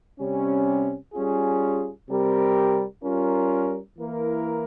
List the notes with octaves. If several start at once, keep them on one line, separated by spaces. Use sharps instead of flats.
C3 G3 C#4
G3 C#4 F4 G#4
C3 G3 C4 G4 A#4
G3 C#4 F4 A#4
E3 A#3 E4 A#4